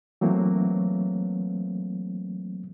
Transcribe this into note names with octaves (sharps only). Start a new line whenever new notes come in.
E3 F#3 A3 A#3 C4